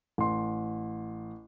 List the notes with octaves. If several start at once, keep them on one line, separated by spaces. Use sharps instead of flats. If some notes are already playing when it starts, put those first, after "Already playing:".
A1 C6